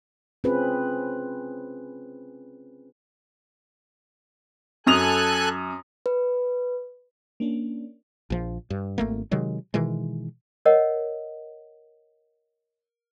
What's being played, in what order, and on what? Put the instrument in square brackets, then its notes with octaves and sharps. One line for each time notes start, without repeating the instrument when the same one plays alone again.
[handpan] C4 C#4 F4 G#4 B4
[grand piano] F#2 D#6 F7 [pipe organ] A4 G#5 F#6
[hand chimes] B4
[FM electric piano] A#3 C#4 D4
[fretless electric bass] A#1 F3
G2
G#1 A3 A#3
C3 D#3 F#3 G#3
B2 D#3 E3 G#3
[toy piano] A#4 C#5 D#5 F#5